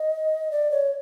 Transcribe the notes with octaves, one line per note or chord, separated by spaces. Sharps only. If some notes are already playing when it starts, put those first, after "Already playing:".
Already playing: D#5
D5
C#5